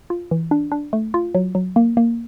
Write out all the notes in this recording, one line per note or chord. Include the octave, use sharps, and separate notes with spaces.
F4
E3
D4
D4
A3
F4
F#3
F#3
A#3
A#3